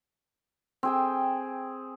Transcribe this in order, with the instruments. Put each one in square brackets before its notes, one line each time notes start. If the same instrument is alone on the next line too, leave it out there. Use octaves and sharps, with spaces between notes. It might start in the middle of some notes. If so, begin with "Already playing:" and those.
[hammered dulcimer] C4 G#4 G5